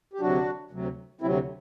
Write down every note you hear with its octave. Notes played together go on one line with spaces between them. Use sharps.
G4
D2 C3 F#3 D4 F#4
D2 C3 F#3
D2 C3 F#3 C4 E4